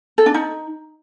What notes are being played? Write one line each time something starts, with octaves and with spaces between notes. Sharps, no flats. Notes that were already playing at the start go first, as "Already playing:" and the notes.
A4
D4
D#4